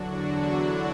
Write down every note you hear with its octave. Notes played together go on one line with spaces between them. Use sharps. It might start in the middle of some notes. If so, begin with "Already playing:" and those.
Already playing: E2 D3 F#3 D4 F#4
E4